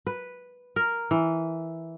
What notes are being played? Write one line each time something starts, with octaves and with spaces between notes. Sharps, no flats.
B4
A#4
E3